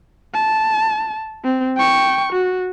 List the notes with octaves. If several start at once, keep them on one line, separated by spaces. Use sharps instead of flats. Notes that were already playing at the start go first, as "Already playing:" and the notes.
A5
C4
G5 C#6
F#4